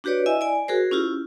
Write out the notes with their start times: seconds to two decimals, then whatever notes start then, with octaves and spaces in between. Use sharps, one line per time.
0.04 D4 F#4 G4 B4 C#5 D5
0.26 E4 D#5 E5 G#5
0.41 D5 G#5
0.68 F#4 G#4 A#4 C5
0.91 C#4 E4 F4 G4